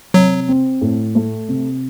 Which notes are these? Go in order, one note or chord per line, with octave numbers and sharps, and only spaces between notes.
C3 F#3
C4
A2
A3
C3